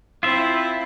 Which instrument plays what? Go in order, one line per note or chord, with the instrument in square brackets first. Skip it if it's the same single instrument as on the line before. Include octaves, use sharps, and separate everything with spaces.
[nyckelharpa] C4 E4 [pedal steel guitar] F4 E5